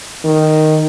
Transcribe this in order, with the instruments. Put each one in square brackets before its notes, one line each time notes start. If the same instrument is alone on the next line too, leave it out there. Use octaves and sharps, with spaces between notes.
[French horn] D#3